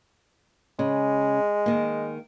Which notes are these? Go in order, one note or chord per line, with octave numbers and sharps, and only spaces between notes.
C#3 G#3
D#3 A#3